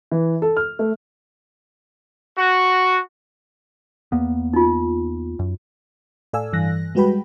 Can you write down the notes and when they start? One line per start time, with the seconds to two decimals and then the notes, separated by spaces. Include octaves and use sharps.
0.12 E3
0.42 A4
0.57 F6
0.79 A3
2.36 F#4
4.12 E2 A#3 B3
4.54 D#4 F4
5.39 F#2
6.33 A2 A4 D5 F5 G#5 E6
6.53 G2 E3 F#6 A#6
6.95 G3 G#3 F#4 B4 G5 B5